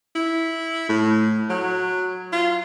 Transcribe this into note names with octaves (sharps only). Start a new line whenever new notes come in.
E4
A2
F#3
F4